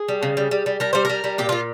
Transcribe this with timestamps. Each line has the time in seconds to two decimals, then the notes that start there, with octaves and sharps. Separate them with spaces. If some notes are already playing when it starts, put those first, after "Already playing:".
Already playing: G#4
0.08 G3
0.23 C#3
0.37 G3
0.51 G3
0.66 G3
0.80 G3 A#4
0.93 G3 C5
1.05 G3 A#4
1.24 G3
1.38 A#2 G4
1.49 A#2 F4